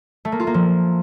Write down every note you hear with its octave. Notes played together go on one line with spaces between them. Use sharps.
A3
A#3
F4
A#3
F3